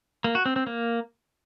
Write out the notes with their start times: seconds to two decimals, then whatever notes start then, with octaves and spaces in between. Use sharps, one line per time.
0.24 A#3
0.35 F#4
0.46 C4
0.56 C4
0.67 A#3